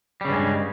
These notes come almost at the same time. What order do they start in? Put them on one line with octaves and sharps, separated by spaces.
G3 C#3 G2 G#3